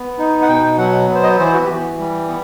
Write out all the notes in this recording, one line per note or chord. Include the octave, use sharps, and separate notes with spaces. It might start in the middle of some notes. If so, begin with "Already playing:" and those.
Already playing: B3
D#4
F#5
B2 G5
F#3 F#5
B3
C5
D#5
E3 C5
F#4
G4
E3 F#4
G3
B3